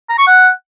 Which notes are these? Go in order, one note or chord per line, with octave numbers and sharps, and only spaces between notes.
A#5
C#6
F#5